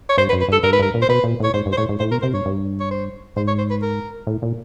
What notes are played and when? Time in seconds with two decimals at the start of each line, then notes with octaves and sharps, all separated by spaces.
0.09 C#5
0.17 G2 C5
0.29 B4
0.33 F#2
0.41 B4
0.48 G2 A4
0.63 G2 A#4
0.73 G#2 B4
0.79 G2 A#4
0.94 A#2
1.02 C5
1.09 B2 B4
1.24 A#2
1.40 A2 C#5
1.54 G#2 C5
1.66 G2
1.72 C5
1.77 A2 C#5
1.89 G#2
2.00 A2 C5
2.11 B2 A#4
2.22 C3 C5
2.33 G2 C#5
2.46 G2
2.80 C#5
2.91 C5
3.36 G#2 C5
3.48 C#5
3.58 C5
3.70 B4
3.82 A#4
4.27 A2
4.42 A#2